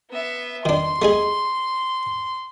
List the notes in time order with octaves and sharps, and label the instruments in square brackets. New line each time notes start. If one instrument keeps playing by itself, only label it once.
[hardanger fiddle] B3 E5
[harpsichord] D#3 D4 [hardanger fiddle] C6
[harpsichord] A3 D#4 G#4